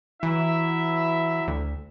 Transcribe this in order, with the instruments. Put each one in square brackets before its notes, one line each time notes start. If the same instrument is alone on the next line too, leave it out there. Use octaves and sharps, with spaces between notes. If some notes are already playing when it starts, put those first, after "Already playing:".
[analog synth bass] E3 [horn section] F#3 E4 E5
[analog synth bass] D2